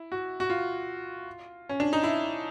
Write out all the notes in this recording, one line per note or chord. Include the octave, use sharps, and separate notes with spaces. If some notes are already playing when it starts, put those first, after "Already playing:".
Already playing: E4
F#4
F#4
F4
C#4
D4
D#4
E4